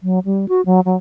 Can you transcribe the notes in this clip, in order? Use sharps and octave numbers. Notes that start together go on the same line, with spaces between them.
F#3
G3
F#4
F#3
F#3